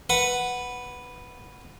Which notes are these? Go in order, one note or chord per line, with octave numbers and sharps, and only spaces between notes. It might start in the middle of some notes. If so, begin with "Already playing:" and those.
B4 F#5